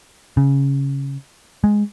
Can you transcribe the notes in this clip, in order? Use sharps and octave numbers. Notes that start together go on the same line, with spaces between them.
C#3
G#3